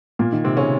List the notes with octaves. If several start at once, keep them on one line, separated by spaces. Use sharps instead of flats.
A#2 A#3
D#3
C3 C4
C#3 C#4